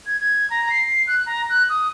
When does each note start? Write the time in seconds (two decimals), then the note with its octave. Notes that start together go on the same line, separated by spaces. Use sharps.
0.06 G#6
0.20 G#6
0.50 A#5
0.70 C7
1.07 F#6
1.26 A#5
1.50 F#6
1.69 D#6